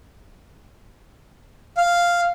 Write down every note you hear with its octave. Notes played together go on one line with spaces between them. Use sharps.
F5